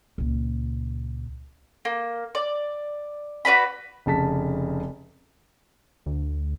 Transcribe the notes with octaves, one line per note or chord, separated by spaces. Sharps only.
C#2 A#2
A#3
D5
F#4 B4 D5 B5
F1 C#3 A5 B6
D2